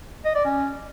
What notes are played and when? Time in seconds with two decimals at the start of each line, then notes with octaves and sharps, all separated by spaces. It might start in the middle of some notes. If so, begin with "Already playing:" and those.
0.25 D#5
0.35 D5
0.45 C#4